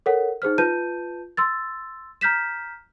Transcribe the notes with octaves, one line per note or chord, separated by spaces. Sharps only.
A4 A#4 C#5 F#5
D#4 G#4 C5 F6
F4 B4 A5 G6 D#7
C6 E6 A6
A#5 F6 G6 B6 E7